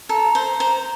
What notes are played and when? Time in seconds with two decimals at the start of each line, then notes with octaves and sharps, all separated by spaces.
0.09 A4 A#5
0.35 C5
0.60 C5